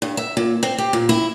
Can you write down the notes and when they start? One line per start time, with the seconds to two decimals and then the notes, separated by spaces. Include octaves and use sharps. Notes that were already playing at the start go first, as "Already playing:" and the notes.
0.02 G2
0.17 E5
0.37 A#2
0.63 C4
0.78 G4
0.93 A#2
1.09 E4